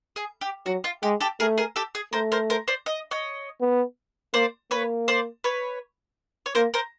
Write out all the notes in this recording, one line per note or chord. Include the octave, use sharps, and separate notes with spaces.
G#4
G4
F#3 F#4
F4
G#3 G4
G4 A4
A3 G#4 A#4
G#4 A#4
G4 A4
G#4
A3 A#4 C5
A#4 C5
A#4 C5
C5 D5
D#5
C#5 D#5
B3
A#3 C5 D5
A#3 B4 C#5
C5 D5
B4 C#5
C#5
A#3 A#4 C5
A#4 C5